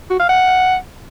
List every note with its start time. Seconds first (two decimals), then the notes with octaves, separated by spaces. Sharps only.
0.10 F#4
0.20 F5
0.29 F#5